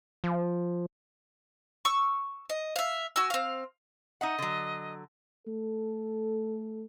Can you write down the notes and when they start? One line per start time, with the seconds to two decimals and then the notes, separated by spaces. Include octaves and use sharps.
0.24 F3
1.85 C#6 E6
2.49 D#5
2.76 E5 F5
3.16 F#4 G#5 E6
3.30 C4 F5
4.21 D#4 D#5 E5 F#5
4.39 D3 F#3
5.47 A3 A4